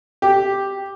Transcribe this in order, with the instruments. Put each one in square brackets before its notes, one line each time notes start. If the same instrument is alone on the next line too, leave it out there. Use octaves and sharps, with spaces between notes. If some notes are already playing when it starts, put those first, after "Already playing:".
[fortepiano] G4